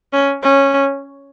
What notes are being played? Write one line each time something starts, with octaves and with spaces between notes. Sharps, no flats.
C#4
C#4